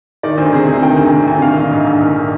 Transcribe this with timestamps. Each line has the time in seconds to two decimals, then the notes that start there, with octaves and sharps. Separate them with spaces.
0.23 D#3 D5
0.38 D2 C5
0.53 C3 G#4
0.68 D2 G#4
0.83 D#3 G5
0.97 D2
1.12 C3
1.28 D2
1.42 D#3 F5
1.57 A#1
1.72 G#2
1.86 A#1
2.02 D#3